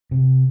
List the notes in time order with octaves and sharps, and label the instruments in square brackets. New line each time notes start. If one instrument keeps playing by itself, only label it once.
[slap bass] C3